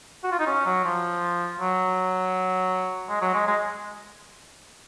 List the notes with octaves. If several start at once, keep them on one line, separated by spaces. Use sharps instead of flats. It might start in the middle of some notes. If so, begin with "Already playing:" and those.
F#4
F4
D#4
C#4
F#3
F3
F#3
G#3
F#3
G#3
G#3